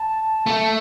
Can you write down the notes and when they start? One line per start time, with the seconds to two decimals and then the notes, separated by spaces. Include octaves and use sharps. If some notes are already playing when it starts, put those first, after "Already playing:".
Already playing: A5
0.46 A3